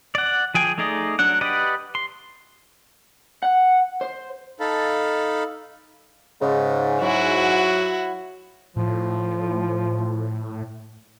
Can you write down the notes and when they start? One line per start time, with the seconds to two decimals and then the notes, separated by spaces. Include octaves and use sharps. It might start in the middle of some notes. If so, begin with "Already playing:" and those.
0.15 D5 F#5
0.55 F3 G#4 G5 G#5
0.78 A3 D#4 G#4 D5 D#5
1.19 F#3 D4 F#5
1.41 G4 B4 D5 D#5 F#5
1.95 C6
3.43 F#5
4.01 C5
4.60 D#4 A4 F5 A5 B5
6.42 G#2 C#3
7.01 F#3 E4 F#4
8.76 A2 F3